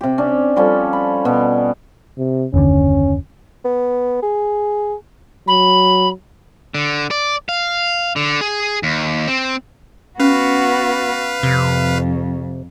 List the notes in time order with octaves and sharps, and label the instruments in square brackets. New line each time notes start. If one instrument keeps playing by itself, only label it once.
[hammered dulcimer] C3 G4
C#4 D4
F3 G3 C#4 A4
B5
B2 B3
[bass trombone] C3
[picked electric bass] F#1 D#2 D3 [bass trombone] C#4
[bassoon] B3
G#4
[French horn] F#3 [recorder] B5
[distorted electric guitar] D3
D5
F5
D3
G#4
D#2
C4
[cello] B3 F#4 [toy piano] C#4 [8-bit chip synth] B4 F5
[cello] F2 [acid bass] C3